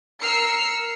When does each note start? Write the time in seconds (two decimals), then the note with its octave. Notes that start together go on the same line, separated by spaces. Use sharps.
0.21 A#4 E6 F6 C7 C#7